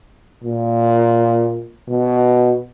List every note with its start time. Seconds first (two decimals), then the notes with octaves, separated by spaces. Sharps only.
0.44 A#2
1.88 B2